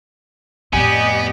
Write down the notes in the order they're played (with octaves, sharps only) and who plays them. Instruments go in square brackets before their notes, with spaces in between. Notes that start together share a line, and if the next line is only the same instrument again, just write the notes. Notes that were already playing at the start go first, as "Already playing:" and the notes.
[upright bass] F2 A2 [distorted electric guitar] B3 [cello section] G4 D5 D#5 [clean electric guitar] G#5